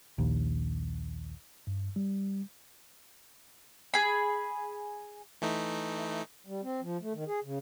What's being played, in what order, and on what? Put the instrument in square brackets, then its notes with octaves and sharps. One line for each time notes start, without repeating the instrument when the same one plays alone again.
[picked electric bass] A#1 D#2
[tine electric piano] G2
G3
[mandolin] G#4 B5
[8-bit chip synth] E3 A3 D#4
[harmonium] G3
C4
F3
A3
D#3
G#4
C#3